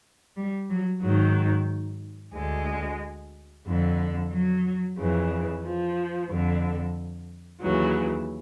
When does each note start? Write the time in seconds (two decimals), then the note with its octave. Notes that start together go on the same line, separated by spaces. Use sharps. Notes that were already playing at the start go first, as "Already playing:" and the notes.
0.37 G3
0.70 F#3
1.02 G#2 D#3 F#3
2.35 D2 D3 G#3
3.66 F2 D3
4.32 F#3
4.98 F2 C#3 E3
5.63 F3
6.30 F2 D3
7.61 D#2 C#3 E3 F#3